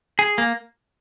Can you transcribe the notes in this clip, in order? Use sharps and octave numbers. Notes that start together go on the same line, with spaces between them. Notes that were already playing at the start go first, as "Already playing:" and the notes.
G#4
A#3